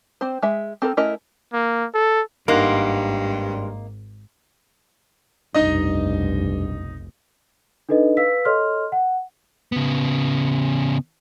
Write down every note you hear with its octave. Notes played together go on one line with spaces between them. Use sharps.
C4 C5
G#3 E5
C4 A4 A#4
A3 C#4 E4 A#4 D#5
A#3
A4
G#1 G2 A#3 D#4 A#4 C5 F#5
F1 B1 G2 D#4 D#5
D4 D#4 A4 B4 D#5
B4 F5 E6 B6
A4 C#5 D#5 C6 F6
F#5
C#3 B3